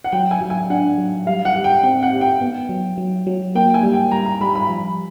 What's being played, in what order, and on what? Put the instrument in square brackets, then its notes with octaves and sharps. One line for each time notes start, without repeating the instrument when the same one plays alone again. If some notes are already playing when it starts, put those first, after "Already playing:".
[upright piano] F#5
[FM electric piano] F#3 [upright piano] G5
[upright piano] G#5
[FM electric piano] F#3
[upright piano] G#5
[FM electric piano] D4 [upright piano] F#5
[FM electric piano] F#3
[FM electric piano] G3 [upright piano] F5
[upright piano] F#5
[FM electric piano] G4
[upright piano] G5
[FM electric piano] C4 [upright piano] G5
[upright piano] F#5
[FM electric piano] G4
[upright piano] G5
[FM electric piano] B3
F#3
F#3
F#3
[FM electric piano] A#3 [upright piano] G5
[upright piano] G#5
[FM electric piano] G3
[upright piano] G5
[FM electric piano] G3 [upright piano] A#5
[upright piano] A#5
[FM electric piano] G3 [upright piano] B5
[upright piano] B5
[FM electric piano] F3